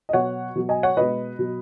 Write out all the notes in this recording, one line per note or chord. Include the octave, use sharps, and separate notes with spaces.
D#5
B2 F#3 C#5 F#5
B2 F#3
D#5 G#5
C#5 F#5
B2 G#3 B4 D#5
B2 F#3